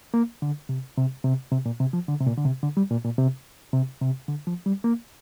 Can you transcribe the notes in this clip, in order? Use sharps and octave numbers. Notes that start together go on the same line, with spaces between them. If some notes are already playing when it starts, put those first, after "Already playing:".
A#3
D3
C3
C3
C3
C3
A#2
C3
F3
D3
C3
A#2
D3
C3
D3
G3
A#2
A#2
C3
C3
C3
D3
F3
G3
A#3